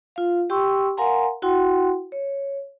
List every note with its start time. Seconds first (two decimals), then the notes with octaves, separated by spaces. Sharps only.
0.16 F4 F5
0.50 G4 G5 C6 C#6 E6
0.97 A#4 F5 F#5 G#5 A#5 C6
1.42 E4 F#4 F#5 G5 C6
2.12 C#5